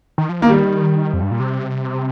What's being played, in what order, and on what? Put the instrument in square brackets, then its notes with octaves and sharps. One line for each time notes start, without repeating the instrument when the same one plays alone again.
[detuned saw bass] D#3
F3
[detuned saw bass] D#3 [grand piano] A#3
[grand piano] G3
[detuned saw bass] F2
G2
A#2
C3